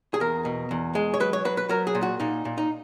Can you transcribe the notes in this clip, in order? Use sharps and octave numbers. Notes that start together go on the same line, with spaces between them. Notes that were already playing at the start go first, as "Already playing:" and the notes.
G#4
E2 A#4
B2
E2
G#3
C#5
F#3 B4
C#5
F#3 B4
B4
F#3 A#4
G#4
A#2
F#4
A#2 D#4
A#2
D#4